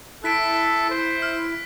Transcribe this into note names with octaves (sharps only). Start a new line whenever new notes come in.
E4 A4 F#6 B6 D7
C5
F6